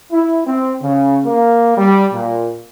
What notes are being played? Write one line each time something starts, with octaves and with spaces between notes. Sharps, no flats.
E4
C4
C#3
A#3
G3
A#2